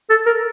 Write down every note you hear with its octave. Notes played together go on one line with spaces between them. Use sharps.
A4
A#4